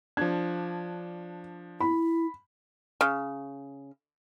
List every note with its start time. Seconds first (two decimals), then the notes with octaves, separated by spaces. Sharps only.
0.17 F3 D4 G#6
1.81 E4 B5
3.01 C#3